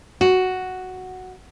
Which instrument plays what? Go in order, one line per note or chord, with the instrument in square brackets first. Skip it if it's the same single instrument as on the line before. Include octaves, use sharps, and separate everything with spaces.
[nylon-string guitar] F#4